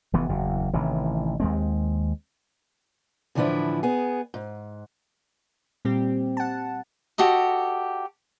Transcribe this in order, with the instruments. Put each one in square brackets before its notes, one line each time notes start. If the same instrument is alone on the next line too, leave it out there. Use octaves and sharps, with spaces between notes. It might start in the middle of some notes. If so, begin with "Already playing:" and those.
[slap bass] F1 E3 B3
F#1 E2
A1 C3 D#3 E3
D#2 G#3 C4
[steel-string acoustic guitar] A2 D3 E3 F3 D4 E4
B3 G#4
G#2
[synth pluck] A#2 G3 C4 G4
F#5 A5
[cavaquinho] F#4 G4 A4 D#5